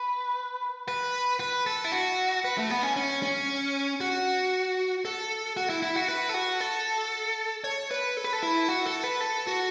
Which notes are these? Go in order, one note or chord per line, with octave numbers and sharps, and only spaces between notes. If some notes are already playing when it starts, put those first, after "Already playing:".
Already playing: B4
B4
B4
A4
E4
F#4
B4
A3
B3
C#4
C#4
C#4
F#4
A4
F#4
E4
E4
F#4
B4
A4
F#4
A4
C#5
B4
A4
B4
A4
E4
F#4
A4
B4
A4
F#4